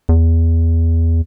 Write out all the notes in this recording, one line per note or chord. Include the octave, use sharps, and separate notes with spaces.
E2